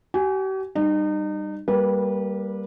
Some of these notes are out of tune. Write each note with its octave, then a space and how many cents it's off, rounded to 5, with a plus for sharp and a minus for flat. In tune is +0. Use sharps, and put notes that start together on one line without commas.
G4 -45 G#5 +0
G3 +0 D#4 -35
G3 +0 A#3 +0 B4 -25